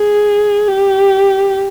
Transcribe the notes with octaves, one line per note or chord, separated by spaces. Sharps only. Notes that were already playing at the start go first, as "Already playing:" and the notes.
Already playing: G#4
G4